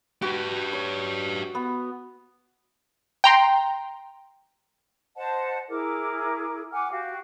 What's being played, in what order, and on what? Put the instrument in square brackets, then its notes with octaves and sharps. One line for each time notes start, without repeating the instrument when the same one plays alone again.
[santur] F#4 [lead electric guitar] G4 B4
[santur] C#5
B3
[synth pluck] G5 A#5 C6
[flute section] C5 D#5 F#5 A5
E4 G#4 A#4 D6
F#5 G#5 D6 F6
F#4 G4 F5